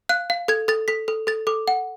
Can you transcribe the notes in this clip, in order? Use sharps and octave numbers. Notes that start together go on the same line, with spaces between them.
F5 F#6
F5
A4 G#6
A4 A6
A4 B6
A4
A4 A6
A4 D6
F#5